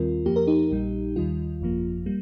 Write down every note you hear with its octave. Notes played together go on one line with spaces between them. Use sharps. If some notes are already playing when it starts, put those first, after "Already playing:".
Already playing: D#2 D#3 G3 C4 F4 A#4
F2 F3 A#3 G4
A#4
D#4 G4
A#1 A#2 G3
D#2 D#3 G3 F4
G1 F2 F3 A#3
G3 A#3